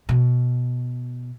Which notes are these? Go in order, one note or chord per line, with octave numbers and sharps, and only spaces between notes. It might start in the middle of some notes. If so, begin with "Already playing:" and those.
B2